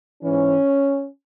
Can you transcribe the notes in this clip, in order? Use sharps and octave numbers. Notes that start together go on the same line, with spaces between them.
G#2 E3 C#4